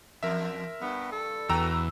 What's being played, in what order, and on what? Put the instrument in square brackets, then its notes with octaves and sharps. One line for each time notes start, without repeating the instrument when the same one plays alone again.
[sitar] E2 [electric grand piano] A#4 E5
[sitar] G2 [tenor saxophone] B3
[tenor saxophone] A4
[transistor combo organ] E2 [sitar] F#4 B4 [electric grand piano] G5 A#5 E6